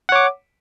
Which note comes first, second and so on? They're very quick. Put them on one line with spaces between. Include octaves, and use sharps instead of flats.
F#5 C#5 D6